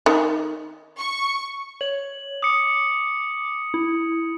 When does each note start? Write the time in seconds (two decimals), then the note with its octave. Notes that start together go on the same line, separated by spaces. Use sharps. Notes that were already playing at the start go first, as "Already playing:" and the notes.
0.06 D#3
0.99 C#6
1.81 C#5 F#7
2.42 D6 D#6 C#7
3.74 E4